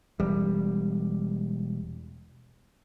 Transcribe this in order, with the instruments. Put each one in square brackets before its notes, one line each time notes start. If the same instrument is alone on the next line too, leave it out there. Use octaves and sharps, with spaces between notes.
[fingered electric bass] E1 G3